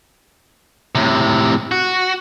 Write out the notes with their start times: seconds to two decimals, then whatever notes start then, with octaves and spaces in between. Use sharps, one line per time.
0.95 A2 C3
1.71 F#4